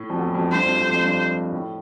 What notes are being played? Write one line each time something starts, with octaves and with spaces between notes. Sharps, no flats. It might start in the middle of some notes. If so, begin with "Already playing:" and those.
Already playing: A2
F2
E2
F2
G2 C5
F2
F2
F2
G2
A2